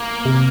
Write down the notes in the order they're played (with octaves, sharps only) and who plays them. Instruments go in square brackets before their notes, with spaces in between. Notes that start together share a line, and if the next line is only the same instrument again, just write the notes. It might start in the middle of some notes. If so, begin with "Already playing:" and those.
Already playing: [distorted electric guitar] A#3
[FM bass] C3